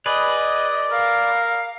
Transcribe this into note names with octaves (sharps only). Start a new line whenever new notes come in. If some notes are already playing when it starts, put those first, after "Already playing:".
G#4 B4 D5 D#5
A#4 F5